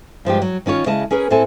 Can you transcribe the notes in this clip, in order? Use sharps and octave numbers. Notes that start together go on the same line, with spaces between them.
G2 F3 G#3 G4
F#3
D#3 C#4 F4 C#5
C#3 G#3 E4 D#5 A5
C#4 G#4 A#4 B4
A2 C4 E4 A4 G#5